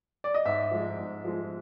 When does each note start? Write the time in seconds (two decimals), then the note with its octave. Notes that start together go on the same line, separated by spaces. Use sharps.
0.24 D5
0.34 D#5
0.45 G#2 E5
0.71 F3 G#3
0.98 G#2
1.25 F3 G#3